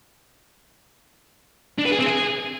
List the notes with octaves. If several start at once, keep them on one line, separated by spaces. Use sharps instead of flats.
D4
B4
G#4
C4
G#4